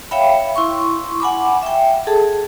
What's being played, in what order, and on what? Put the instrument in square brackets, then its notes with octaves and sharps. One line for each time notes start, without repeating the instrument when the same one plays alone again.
[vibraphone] C#5 E5 F5 G5 B5
E4 C6 C#6
F#5 G#5 B5 D6
E5 G5
G#4 A4 A5